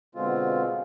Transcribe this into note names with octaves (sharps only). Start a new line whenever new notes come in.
B2 D3 G#3 C4 F4